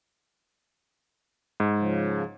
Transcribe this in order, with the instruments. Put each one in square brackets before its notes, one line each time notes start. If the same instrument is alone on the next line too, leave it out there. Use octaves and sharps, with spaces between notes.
[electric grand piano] G#2
[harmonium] C#3 F3